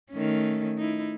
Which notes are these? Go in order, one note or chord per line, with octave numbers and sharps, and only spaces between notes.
D#3 A3 C#4
D#4 E4